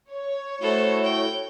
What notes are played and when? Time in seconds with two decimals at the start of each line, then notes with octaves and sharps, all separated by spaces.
0.12 C#5
0.62 A3 E4 F#4 A4 C5
1.03 G5